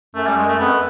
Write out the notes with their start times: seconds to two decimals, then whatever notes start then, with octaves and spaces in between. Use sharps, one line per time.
0.15 F#2 A3
0.27 G3
0.37 G#3
0.49 A3
0.59 F2 B3